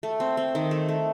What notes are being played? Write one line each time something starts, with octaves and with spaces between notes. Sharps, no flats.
A3
C4
C4
D#3
A3
A3